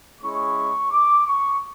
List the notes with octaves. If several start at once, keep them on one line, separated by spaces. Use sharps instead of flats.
G#3 C#4 E4 C#6
D6
C#6